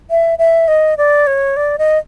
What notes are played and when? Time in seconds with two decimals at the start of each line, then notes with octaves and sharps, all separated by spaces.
0.10 E5
0.39 E5
0.68 D#5
0.98 D5
1.27 C#5
1.57 D5
1.78 D#5